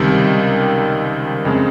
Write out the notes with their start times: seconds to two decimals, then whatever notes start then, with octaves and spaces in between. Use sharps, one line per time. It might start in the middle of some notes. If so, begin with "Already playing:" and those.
Already playing: C#2 C3 D#3 G3
1.45 F2 C#3 G#3 C4